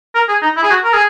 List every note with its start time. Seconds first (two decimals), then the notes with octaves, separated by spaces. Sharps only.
0.15 A#4
0.28 G#4
0.42 D#4
0.57 E4
0.63 G#4
0.71 F#4
0.84 A#4
0.94 G#4